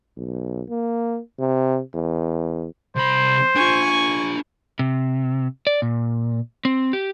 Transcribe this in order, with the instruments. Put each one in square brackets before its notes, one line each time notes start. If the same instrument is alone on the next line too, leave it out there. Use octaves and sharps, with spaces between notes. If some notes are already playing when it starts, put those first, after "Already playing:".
[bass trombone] B1
A#3
C3
E2
[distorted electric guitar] C2 B5 [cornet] C5
[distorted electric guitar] D4 F4 [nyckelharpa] G#5 C#6
[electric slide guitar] C3
D5
A#2
C4
G4